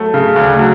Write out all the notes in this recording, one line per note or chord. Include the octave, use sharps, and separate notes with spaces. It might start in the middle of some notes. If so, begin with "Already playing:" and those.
Already playing: F#3 A3
C#3
D2
F#3